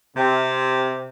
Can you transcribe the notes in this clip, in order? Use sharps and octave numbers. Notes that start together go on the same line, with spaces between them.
C3